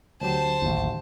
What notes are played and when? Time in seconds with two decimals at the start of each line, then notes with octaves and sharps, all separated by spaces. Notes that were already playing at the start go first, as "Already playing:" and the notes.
0.21 D2 F#3 G4 C5 A5
0.62 A1 D#2